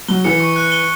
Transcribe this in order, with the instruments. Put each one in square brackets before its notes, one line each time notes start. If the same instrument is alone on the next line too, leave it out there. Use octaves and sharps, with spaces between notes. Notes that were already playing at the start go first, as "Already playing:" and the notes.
[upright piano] F#3 [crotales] G7
[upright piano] E3 [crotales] C#7
[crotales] C#6
F#6
G7